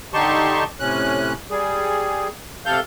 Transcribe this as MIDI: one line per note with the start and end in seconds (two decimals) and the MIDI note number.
0.14 0.64 50
0.14 0.64 63
0.14 0.64 67
0.14 0.64 81
0.14 0.64 84
0.14 0.64 85
0.80 1.33 45
0.80 1.33 48
0.80 1.33 61
0.80 1.33 90
1.51 2.28 55
1.51 2.28 68
2.66 2.80 48
2.66 2.80 69
2.66 2.80 77
2.66 2.80 91